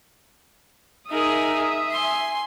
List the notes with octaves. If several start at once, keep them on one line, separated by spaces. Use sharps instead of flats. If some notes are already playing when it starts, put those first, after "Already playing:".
D#4 G#4 A#4 E5 D#6
G#5 C6